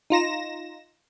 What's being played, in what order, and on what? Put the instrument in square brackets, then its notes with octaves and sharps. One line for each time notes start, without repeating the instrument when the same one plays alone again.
[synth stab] D#4 F4 A#6 E7